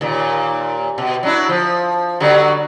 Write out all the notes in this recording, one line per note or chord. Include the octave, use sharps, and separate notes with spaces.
D#2 A#2
B2
F#3 D4 E4
F3
D3 F#3 G3